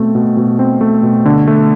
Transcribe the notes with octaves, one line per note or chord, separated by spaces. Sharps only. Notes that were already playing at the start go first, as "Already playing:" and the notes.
Already playing: B2 A3 C4
B2
B2
C4
A3
B2
D3
A3